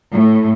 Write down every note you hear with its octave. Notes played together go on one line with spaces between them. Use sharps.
A2